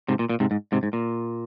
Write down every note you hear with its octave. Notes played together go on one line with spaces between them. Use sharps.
G#2 C3
A#2
A#2
G#2 C3
G#2
G#2 C3
G#2
A#2